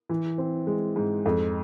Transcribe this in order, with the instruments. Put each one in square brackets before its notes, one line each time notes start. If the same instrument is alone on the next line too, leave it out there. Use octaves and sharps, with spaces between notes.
[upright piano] E3
C4
G#3
G#2
F2